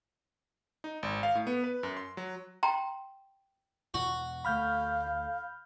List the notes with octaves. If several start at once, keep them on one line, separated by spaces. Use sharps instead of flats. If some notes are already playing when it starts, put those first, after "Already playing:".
D#4
G#1
F5
A2
B3
B4
F#2
C6
F#3
G5 A#5 C6
E2 B2 F#4
D2 A3 F5 B5 F6 G6